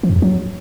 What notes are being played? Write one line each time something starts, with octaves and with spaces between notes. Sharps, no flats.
F3
F#2
E2
F#3